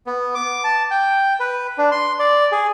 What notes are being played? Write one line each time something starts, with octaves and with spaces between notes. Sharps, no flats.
B3
D6
A5
G5
B4
D4
C6
D5
G#4